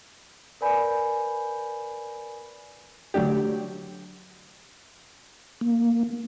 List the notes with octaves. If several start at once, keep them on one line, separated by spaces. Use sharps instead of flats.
A#4 B4 D5 G#5 B5 G6
D3 F#3 A3 D4 G4
A#3